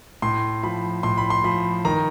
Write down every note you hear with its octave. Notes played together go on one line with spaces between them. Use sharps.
A2 C6
F3 B5
A2 C6
B5
C6
F3 B5
D#3 A#5